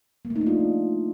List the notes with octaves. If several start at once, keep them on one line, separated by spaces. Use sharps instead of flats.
A#3
A3
D#4
D4
F4